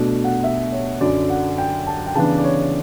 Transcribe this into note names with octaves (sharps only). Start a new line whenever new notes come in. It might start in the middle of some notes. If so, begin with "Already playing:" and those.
Already playing: B2 A3 D4
F#5
E5
C#5
F#2 D3 F#3 D5
F#5
G5
A5
G5
C#3 E3 B3 D4 A5
D5
C#5